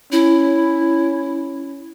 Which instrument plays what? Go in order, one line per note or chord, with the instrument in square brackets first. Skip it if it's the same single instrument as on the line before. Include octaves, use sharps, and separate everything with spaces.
[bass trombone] C#4 [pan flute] E4